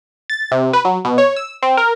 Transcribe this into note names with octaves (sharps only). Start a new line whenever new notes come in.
A6
C3
B4
F#3
B2
C#5
E6
C4
A#4